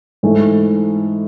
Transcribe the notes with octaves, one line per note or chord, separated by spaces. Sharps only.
G#2 E3 A3 E4